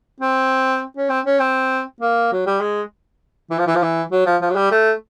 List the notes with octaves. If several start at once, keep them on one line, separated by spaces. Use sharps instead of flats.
C4
C#4
C4
C#4
C4
A#3
F#3
G3
G#3
E3
F3
E3
F3
E3
F#3
F3
F3
F#3
G3
A3